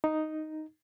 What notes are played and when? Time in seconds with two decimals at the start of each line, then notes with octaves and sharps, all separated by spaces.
0.04 D#4